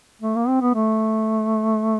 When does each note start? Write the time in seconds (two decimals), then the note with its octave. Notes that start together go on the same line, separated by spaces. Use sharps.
0.22 A3
0.36 A#3
0.48 C4
0.61 B3
0.74 A3